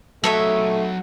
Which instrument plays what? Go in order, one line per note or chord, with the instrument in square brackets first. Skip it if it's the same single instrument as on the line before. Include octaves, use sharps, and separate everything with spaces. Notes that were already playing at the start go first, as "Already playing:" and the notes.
[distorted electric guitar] F#3 D#5 [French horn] A3 [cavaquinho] A4 C#5 E5